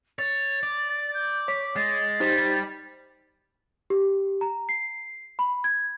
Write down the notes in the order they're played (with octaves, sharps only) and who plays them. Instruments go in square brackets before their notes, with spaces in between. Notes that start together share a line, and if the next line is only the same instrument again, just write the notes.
[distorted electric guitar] C#5 [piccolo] A6
[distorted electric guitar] D5
[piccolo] G6
[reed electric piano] C#5 D6 [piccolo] B6
[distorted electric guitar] G#3 [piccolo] A6
[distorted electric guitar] G3 [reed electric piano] D#4 G4 C5
[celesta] G4
A#5
C7
B5
G#6